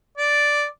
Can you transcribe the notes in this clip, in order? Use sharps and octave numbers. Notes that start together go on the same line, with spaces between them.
D5